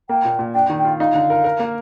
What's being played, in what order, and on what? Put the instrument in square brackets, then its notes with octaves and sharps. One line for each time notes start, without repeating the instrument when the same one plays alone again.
[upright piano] A#3 [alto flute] G5
[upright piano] A#2
A#2
[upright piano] D4 [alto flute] G5
[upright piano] D#3
[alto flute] G5
[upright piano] F4
[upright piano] D#4 [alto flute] F5
[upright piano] D3
A#4
A#4
A#3